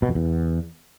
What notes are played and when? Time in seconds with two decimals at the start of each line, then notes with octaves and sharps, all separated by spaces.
0.02 B2
0.09 F2
0.15 E2